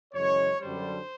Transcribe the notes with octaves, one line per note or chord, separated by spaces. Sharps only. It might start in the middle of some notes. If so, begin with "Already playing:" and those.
F#2 C#3 E3 G#3 C#5
F#2 D3 G3 C5